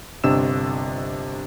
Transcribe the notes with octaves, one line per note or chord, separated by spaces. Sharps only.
G1 C3 D4 D#5 E6 E7